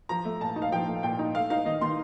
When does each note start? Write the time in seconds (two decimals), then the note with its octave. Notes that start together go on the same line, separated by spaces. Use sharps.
0.09 F3 A#5
0.25 A3
0.41 A#2 A5
0.56 D#4
0.62 F5
0.72 F3 G5
0.88 A3
1.03 A#2 G5
1.19 D#4
1.34 A3 F5
1.50 D#4 F5
1.65 D#3 D#5
1.81 D#3 C6